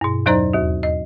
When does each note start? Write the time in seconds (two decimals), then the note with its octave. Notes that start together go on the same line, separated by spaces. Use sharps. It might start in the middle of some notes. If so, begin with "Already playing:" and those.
0.01 G2 B2
0.26 E2 F#3 D#4 C5 D5 A#5
0.53 D#2 F#4
0.83 D#5